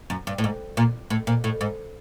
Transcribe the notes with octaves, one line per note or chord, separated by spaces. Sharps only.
F#2
G2
A2
G#2
A#2
A2
A#2
A2
G#2